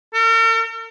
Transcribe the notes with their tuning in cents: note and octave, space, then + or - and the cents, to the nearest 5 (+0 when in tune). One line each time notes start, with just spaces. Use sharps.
A#4 -45